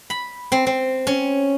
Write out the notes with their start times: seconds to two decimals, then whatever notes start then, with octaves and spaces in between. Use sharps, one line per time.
0.10 B5
0.52 C4
0.67 C4
1.07 C#4